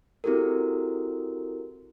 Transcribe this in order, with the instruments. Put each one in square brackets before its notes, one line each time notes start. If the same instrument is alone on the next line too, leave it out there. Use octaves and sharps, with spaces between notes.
[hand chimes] C4 E4 F#4 G4 A4 A#4